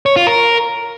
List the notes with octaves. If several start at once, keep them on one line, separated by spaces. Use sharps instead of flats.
C#5
F4
A#4